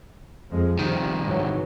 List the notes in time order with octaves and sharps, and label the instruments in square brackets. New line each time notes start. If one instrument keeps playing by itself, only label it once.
[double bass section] F2 F3 G#3
[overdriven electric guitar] C2 D#3 [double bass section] C3 F3
[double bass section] G#2 E3 F#3